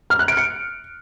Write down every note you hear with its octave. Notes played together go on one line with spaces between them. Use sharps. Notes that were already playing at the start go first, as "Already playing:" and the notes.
F6
F#6
D7
C#7